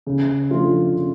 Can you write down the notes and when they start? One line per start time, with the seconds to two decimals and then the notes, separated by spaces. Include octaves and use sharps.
0.07 C#3
0.51 F3 A3 D4 F4
0.94 C#3